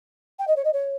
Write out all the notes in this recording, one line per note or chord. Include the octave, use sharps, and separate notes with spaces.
G5
D#5
C#5
D#5
C#5